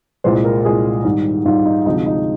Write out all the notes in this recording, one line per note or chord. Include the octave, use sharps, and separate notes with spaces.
C2 A#2 G#3 C5
A#4
C2 A#2 G#3 G#4
G#2 D#3 G3
G#2 D#3 G3 F4
D#4
D2 C3 F3 G#3 D#4
D#4